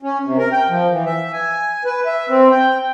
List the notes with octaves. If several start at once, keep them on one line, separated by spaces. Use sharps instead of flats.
C#4
C3
A#4
G5
F3
E3
E5
G#5
B4
E5
C4
G5